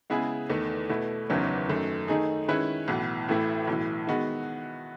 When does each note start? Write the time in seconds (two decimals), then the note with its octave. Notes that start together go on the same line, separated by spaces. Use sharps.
0.10 C#3 G#3 B3 E4 G#4
0.50 E2 D#3 A3
0.89 B2 A3 E4
1.30 F#1 E2 D#3 F#3 C#4
1.68 F#2 D#3 A3
2.08 D#3 A3 D#4 G#4
2.48 D#3 G#3 C#4 E4 B4
2.88 B1 A2 E3 B3
3.28 A1 A2 E3 A3 E4
3.67 B1 A2 E3
4.07 D#3 G#3 B3 F#4